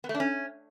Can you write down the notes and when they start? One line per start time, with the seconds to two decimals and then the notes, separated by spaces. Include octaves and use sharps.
0.04 B3
0.09 A3
0.15 D4
0.20 C#4